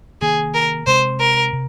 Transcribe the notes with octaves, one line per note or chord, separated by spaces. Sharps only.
C3 D#3 A#3 G#4
A#4
C3 G#3 C4 C5
A#4
C3